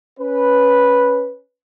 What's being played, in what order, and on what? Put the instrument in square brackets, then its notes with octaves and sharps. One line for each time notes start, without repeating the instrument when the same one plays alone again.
[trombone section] C#4 B4